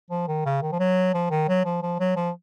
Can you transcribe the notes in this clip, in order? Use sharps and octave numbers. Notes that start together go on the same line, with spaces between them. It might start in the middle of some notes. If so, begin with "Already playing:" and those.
F3
D#3
C#3
D#3
F3
F#3
F3
D#3
F#3
F3
F3
F#3
F3